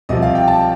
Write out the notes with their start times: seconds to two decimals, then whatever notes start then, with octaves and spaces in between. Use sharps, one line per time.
0.09 C2 C3 F3 D#5
0.22 F5
0.35 G5
0.48 A5